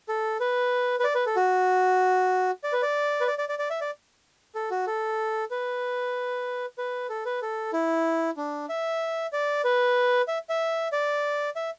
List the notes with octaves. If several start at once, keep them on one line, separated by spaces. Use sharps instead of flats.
A4
B4
B4
D5
B4
A4
F#4
D5
B4
D5
B4
D5
D5
D5
D5
E5
D5
A4
F#4
A4
B4
B4
A4
B4
A4
E4
D4
E5
D5
B4
E5
E5
D5
E5